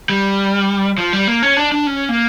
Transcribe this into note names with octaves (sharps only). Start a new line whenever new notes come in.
G3
F3
G3
A#3
C#4
D4
D4
C#4
A#3